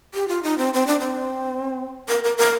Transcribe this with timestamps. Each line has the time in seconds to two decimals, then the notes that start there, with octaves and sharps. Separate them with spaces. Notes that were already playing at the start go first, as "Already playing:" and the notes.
0.14 G4
0.28 F4
0.43 D#4
0.58 C4
0.74 C4
0.87 D4
1.00 C4
2.08 A#4
2.24 A#4
2.38 A#4